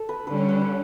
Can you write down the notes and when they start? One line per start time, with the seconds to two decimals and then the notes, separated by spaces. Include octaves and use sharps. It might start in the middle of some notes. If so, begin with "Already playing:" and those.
Already playing: A4
0.09 B4
0.27 D3 G3 C#4 B4
0.38 C#5
0.49 B4
0.61 B4